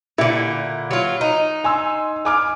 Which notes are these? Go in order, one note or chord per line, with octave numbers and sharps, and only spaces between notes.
A#2 D3 E4
F#3 F4
D#4
G#5 C6 E6
G#5 D6 F6